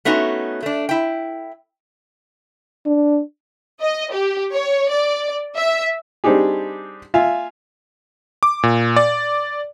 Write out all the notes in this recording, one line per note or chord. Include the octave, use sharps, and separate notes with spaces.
A3 B3 C#4 D#4 F#4
A3 D4
E4 G5
D4
D#5
G4
C#5
D5
E5
G3 C4 D4 D#4 G4 G#4
F4 E5 F5 G#5
D6
A#2
D5